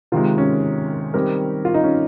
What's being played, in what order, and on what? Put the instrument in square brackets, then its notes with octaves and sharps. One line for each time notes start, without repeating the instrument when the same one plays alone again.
[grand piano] C3 D#3 G#3 [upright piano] F4
[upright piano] C#4
[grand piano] D#3 G3 C4 G4 A#4
[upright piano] F4
D#4
C#4